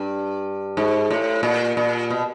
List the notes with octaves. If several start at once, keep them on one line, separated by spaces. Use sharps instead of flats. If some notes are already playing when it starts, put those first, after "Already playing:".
Already playing: G2
G#2
A2
A#2
A#2
B2